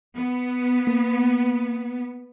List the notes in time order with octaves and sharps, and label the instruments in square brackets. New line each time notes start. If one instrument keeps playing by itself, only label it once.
[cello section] B3
[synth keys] A#3